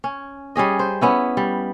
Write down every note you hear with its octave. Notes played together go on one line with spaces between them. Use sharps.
C#4
G3 C#4 G#4 D#5
C5
B3 C#4 E4
G3